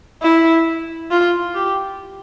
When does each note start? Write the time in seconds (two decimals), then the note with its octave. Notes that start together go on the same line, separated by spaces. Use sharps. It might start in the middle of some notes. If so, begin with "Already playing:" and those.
0.22 E4
1.11 F4
1.55 G4